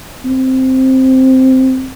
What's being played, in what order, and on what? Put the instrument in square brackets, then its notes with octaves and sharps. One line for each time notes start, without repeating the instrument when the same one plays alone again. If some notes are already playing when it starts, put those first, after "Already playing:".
[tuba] C4